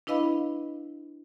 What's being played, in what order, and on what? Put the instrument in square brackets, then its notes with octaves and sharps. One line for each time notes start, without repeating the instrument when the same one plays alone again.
[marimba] D4 E4 B4 D#5 F5 B5